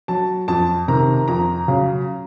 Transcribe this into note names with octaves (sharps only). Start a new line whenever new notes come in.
F#3 A5
F2 A5
C3 D#3 A#5
F2 A#5
C#3 F#3